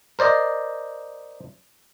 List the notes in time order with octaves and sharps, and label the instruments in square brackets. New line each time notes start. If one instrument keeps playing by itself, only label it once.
[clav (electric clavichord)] A#4 C5 D5 D#5